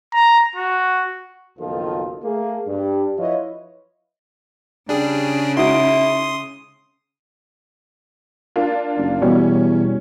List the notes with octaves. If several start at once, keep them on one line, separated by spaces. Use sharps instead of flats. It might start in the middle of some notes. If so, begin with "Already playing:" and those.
A#5
F#4
F#1 B1 D#3 F3 F4 A4
A3 A#3 G#4
G2 G3
F3 E4 F4 B4 C#5 D#5
C#3 G3 D4 G#4
G#3 D#4 E4 F#4 C6 D#6
A#3 D4 F4
F#1
E2 B2 G3 C#4